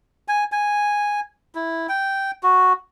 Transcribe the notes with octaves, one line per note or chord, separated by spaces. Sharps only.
G#5
G#5
E4
G5
F#4